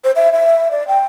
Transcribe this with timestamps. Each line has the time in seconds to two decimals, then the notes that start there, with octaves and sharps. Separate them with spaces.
0.04 C5
0.16 E5
0.33 E5
0.71 D5
0.88 G5